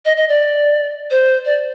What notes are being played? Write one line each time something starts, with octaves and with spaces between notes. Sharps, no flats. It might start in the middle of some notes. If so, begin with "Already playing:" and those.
D#5
D#5
D5
C5
D5